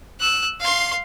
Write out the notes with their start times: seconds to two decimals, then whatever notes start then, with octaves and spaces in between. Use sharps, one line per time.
0.20 E6 F#6
0.60 F5 C6